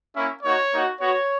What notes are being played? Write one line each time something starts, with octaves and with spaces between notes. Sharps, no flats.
A#3 C#4 E4
A#3 D#4 F#4 C#5
A#3 D#4 F#4
B3 F#4 C#5